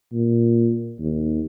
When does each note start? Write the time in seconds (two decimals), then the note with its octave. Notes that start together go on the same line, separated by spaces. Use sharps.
0.13 A#2
1.00 D#2